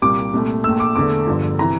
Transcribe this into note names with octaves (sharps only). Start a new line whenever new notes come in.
C2 A#2 G3 A#3 D6
C2 A#2 A3
A#1 A#2 A3 E6
D6
E2 D3 A3 D6
G1 G2 D3 F3
C3 E3 A#5